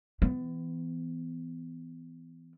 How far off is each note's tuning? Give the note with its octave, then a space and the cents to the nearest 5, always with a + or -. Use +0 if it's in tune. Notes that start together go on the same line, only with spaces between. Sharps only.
E3 +0 B3 +35